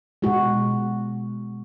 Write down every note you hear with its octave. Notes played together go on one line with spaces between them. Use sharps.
B2 G#3 F#4